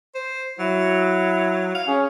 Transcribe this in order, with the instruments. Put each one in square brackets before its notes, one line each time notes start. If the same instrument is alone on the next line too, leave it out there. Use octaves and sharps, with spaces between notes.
[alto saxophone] C5
[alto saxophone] F#3 [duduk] E4
[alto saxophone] F5
[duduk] C#4 [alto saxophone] G#4